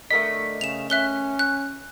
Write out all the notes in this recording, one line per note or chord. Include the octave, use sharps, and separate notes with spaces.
D3 A3 A#4 D#5 B6
C#3 E7 F7
C#4 E5 F#6 G7
F#6